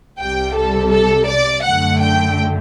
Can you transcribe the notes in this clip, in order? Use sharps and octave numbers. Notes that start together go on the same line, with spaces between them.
C2 C3 G3 G5
A4
A4
D5
F#2 D3 A3 F#5
G5